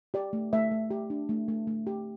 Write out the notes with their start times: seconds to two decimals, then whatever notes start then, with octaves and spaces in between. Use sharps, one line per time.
0.14 G4 D5
0.33 A3
0.53 A3 E5
0.71 A3
0.90 G4
1.10 D4
1.29 A3
1.48 A3
1.67 A3
1.87 G4